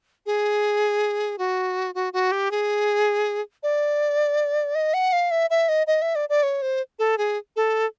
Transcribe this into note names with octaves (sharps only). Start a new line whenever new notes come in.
G#4
F#4
F#4
F#4
G4
G#4
D5
D#5
F#5
F5
E5
E5
D#5
D#5
E5
D5
D5
C#5
C5
A4
G#4
A4